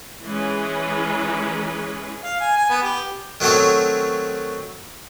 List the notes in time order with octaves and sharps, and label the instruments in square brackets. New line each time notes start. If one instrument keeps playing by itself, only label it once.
[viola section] E3 G#3 C#4 G#4 B4
[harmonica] F5
G#5
G#5
B3
G4
[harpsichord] D#3 F#3 A3 C4 C#5